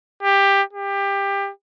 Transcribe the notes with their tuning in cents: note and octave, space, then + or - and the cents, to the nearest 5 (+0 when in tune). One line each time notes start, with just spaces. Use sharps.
G4 +15
G4 +20